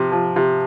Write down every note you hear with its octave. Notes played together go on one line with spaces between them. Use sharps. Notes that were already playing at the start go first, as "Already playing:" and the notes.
Already playing: C3 F3
F3
C3